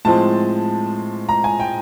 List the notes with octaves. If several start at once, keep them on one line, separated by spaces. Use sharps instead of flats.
A2 F3 G#3 C4 A5
A#5
G#5
G5